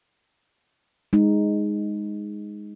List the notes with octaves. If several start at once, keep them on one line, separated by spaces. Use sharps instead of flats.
G#3 D#4